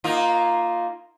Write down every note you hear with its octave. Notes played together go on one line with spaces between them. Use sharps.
A#3 D#4 F4